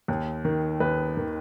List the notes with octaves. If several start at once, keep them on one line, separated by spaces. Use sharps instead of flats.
D#2
D#3
D#2 B4
D#3